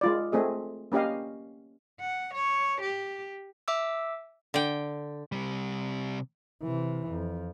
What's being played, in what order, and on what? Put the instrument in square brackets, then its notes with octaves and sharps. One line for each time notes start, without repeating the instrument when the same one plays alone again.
[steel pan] G#3 F4 D5
A3 C4 G#4 D#5
A#3 C#4 G4 D#5 F5
[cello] F#5
C#5
G4
[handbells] E5 D6 E6
[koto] D3 G5
[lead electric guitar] C3 G3
[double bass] C3 E3
F2